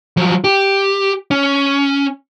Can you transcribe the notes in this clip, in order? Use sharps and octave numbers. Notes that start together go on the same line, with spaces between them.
F3 F#3
G4
C#4